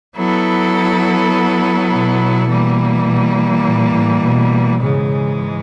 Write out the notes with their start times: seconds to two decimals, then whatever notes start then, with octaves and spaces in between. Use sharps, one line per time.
0.15 F#3 B3 E4 A4
1.91 B2
2.48 E3 G3 A#3
3.07 B2
3.65 A#2
3.94 A2
4.24 B2
4.81 G#2 C#3 E3 G#3